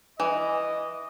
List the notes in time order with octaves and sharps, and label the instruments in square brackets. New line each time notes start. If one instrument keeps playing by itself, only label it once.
[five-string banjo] E3 [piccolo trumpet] D#5